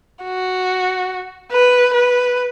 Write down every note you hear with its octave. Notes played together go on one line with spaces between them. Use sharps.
F#4
B4
B4